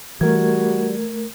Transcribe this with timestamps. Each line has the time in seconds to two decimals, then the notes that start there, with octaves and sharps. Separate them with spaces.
0.21 E3 G3 A3 F#4 A#4 G#6